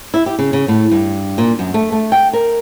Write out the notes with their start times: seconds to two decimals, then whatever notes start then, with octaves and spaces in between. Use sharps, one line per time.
0.14 E4
0.26 G4
0.39 C#3
0.53 C#3
0.68 A2
0.91 G2
1.38 A#2
1.59 F#2
1.74 A3
1.92 A3
2.12 G5
2.33 A#4